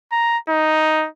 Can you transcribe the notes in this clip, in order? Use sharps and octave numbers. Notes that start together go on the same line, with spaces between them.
A#5
D#4